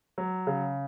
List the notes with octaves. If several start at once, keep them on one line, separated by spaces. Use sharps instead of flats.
F#3
C#3